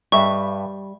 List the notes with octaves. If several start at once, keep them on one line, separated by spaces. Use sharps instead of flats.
G2 G3 D#5 E5 C#6